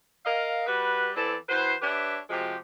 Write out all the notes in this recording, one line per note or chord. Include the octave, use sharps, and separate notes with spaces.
A#4 D#5 F5
G3 F#4 B4
E3 B3 C4 A4 D5
E3 F#4 B4 C5
D4 G4 B4 C#5 E5
C3 F3 G#3 F#4 G4